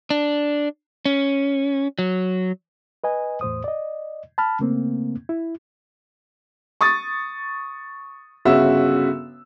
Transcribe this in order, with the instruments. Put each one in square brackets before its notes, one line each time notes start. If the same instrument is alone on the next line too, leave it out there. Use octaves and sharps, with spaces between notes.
[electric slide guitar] D4
C#4
F#3
[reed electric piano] B4 D#5 G#5
E2 A2 C5 D#6
D5 D#5
A5 B5 F6
C#3 A3 A#3 C4
E4
[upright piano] C#6 D#6 A6
G1 C#3 F#4 E5 E6